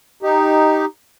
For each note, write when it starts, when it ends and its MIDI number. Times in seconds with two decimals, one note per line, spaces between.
0.23 0.85 63
0.23 0.85 67